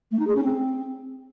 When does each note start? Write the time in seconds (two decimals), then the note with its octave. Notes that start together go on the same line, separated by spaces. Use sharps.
0.11 A3
0.19 D#4
0.27 G#4
0.35 C#4
0.43 C4